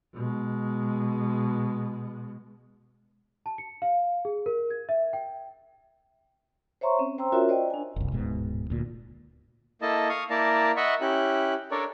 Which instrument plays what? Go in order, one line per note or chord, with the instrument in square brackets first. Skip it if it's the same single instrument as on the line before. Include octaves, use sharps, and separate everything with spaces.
[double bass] B2 G#3
[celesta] A5
C#7
F5
G#4
A#4
G#6
E5
G5
[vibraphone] C5 C#5 E5 A#5 C6 C#6
C4 C#4
C5 G5 A#5 C6 E6
C#4 F4 F#4 A#4 C#5 E5
C5 D5 D#5 G5
D4 G#5
[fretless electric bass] F#1 C2
D1 G#2 B2
D2 A#2
[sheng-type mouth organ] A#3 E4 A4 D#5 A5
F5 C#6 D#6
A#3 E4 A#4 D5 A5 A#5
D#5 E5 F#5 B5 C#6
C#4 E4 G4 F#6
D4 A4 A#4 C#5 D5